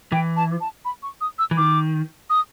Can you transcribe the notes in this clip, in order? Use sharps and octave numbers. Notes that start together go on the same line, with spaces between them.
E3 G5
A5
A5
B5
C#6
D#6
E6
E3
D#3 D6
D#6